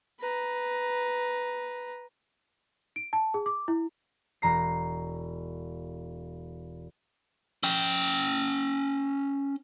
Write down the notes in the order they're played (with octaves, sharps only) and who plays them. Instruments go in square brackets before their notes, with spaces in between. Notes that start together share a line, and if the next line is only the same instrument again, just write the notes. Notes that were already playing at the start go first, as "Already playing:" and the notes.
[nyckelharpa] B4 A#5
[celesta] D7
A5
G#4
D6
E4
[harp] E1 A#5 C7
[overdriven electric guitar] C#4 G5